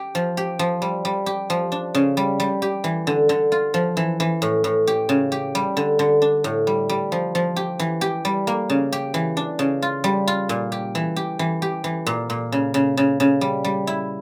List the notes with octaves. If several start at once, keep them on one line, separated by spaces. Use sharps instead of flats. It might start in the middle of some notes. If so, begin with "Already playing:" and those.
Already playing: G4
F3
G4
F3
G3
G3
G4
F3
D4
C#3
G3
G3
G4
E3
D3
D3
F4
F3
E3
E3
A2
A2
G4
C#3
G4
G3
D3
D3
D4
A2
G3
G3
F3
F3
G4
E3
G4
G3
A#3
C#3
G4
E3
D4
C#3
F4
G3
F4
A#2
G4
E3
G4
E3
G4
E3
A#2
A#2
C#3
C#3
C#3
C#3
G3
G3
E4